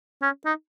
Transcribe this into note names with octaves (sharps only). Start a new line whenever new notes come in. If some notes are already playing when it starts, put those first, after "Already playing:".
C#4
D#4